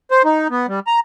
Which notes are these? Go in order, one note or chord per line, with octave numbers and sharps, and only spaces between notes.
C5
D#4
B3
G3
A#5